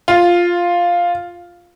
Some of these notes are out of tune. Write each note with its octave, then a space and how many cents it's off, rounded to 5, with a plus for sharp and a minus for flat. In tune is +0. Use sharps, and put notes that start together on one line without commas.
F4 +0